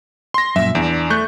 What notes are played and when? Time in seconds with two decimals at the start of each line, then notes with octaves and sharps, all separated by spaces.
0.34 C6 A#6
0.56 F#2 A#2 E5
0.75 E2 D4
1.10 A3 C#6 F#6 G6